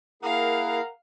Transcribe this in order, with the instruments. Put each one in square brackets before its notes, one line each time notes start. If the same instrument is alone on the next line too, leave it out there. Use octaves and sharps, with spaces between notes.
[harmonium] A#3 E4 G#4 [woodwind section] A#4 F#5 A#5 [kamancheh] F5